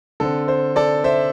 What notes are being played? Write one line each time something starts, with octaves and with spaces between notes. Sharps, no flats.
D3 C4 A4
C5
A4 D5
C5 E5